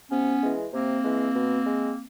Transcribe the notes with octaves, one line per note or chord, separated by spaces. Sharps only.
C3 B3 C#4
E3 G#3
C3 A#3 C4
E3 G#3
B2
G#3